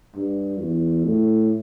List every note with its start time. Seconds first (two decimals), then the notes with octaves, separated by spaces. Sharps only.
0.16 G2
0.60 E2
1.05 A2